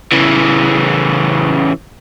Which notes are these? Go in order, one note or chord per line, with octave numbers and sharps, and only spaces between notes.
C#3 E3